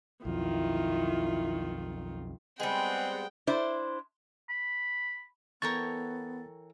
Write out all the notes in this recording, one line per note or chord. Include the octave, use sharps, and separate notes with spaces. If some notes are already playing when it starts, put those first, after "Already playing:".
B1 F2 D#3 E4 F4
G3 G#3 B3 C4 G#4 F#5 G5
D4 E4 C5
B5
E3 B3 A4 A#4 C#5 G5 C#6 A6